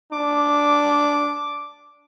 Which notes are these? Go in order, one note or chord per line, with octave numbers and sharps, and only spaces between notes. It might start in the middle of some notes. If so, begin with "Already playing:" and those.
D4 D6